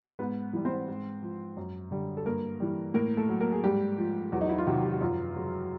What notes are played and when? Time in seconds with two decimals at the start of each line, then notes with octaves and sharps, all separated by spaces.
0.19 G#2 B3 B4
0.53 E3 G3
0.65 C4 C5
0.88 G#2
1.22 F3
1.57 F#2
1.91 D3 G3
2.17 A4
2.26 G2 A#3 A#4
2.60 E3 G3
2.94 A2 A#3 A#4
3.17 A3 A4
3.29 F#3
3.40 A#3 A#4
3.52 G#4
3.64 G#2 G3 G4
3.98 F3
4.32 E2 F#3 F#4
4.41 D#4
4.49 E4
4.58 F4
4.66 C3 D#3 F#3 F#4
4.82 G4
4.91 F#4
5.01 F#2 F3 F4
5.36 C#3 F#3